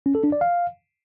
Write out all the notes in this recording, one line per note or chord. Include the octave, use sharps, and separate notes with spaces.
C#4
A4
D4
D5
F5